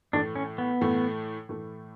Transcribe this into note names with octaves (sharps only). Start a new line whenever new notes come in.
A2 E3 A3 D4
C#4
B3
A2 E3 A3
A2 E3 A3